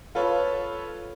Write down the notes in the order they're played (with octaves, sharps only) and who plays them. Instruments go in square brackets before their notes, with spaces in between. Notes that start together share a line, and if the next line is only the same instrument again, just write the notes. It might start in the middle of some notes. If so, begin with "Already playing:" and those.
[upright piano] F4 A4 B4 C#5